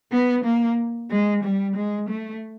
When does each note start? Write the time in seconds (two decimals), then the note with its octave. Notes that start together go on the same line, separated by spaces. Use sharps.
0.12 B3
0.44 A#3
1.10 G#3
1.43 G3
1.76 G#3
2.09 A3